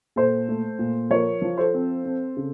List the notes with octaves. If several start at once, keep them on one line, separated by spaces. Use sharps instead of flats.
A#2 A4 C5
A3
A#2
F3 A#4 C#5
F3
A4 C5
C4
C4
C#3